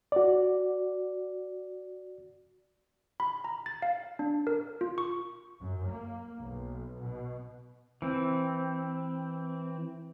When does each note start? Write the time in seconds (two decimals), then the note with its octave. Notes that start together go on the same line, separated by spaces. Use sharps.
0.12 F#4 D5
3.20 B5
3.44 A#5
3.66 A6
3.82 F5
4.19 D4
4.47 A#4
4.81 F4
4.98 C#6
5.60 F#2
5.89 A#3
6.40 B1
7.03 B2
8.02 E3 C4